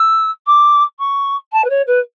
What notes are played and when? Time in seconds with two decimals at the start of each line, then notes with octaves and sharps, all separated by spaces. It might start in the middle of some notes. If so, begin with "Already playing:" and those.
Already playing: E6
0.46 D6
0.99 C#6
1.52 A5
1.64 B4
1.69 C#5
1.87 B4